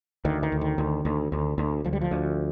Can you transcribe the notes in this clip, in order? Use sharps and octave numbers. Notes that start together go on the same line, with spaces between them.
D2 D#3
D#3
D2
D#3
D2
D2
D2
D2
D2 F3
G3
F3
D2